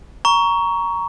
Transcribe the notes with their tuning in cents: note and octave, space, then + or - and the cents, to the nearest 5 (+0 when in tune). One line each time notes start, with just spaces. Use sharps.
A#5 +10 C#6 +15